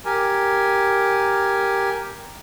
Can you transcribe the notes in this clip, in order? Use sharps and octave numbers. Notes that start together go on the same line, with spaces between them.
G4 A#4 G#5